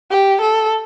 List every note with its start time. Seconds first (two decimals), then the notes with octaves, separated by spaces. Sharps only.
0.11 G4
0.41 A4